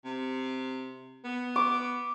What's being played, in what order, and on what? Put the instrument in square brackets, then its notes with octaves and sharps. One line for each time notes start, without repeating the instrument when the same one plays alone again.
[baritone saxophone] C3
B3
[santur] D6